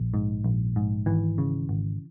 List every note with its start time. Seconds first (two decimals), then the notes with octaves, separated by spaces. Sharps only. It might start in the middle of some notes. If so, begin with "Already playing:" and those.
Already playing: A#1
0.14 G#2
0.44 A#1
0.76 G#2
1.06 G#1 E3
1.38 C#3
1.69 G#1